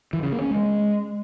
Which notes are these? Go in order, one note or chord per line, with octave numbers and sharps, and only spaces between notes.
E3
C#3
A#3
C#4
G#3